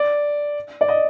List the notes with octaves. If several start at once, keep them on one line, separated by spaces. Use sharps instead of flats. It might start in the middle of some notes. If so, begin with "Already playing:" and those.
Already playing: D5
D5
D#5